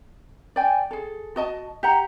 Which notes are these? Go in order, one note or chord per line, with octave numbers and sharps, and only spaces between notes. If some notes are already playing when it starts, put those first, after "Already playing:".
D5 G5 G#5
G#4 A4
F#4 D#5 A5
G4 F#5 A#5